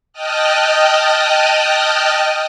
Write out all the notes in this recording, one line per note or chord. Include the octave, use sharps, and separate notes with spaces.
D#5 G5 A5 D#6 F6 F#6